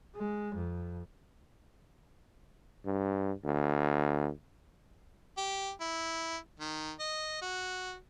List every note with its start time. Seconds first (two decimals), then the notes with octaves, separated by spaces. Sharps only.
0.15 G#3
0.55 F2
2.85 G2
3.44 D2
5.37 G4
5.81 E4
6.60 D#3
7.00 D#5
7.42 F#4